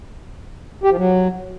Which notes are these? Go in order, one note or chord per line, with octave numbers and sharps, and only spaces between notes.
G4
F3
F#3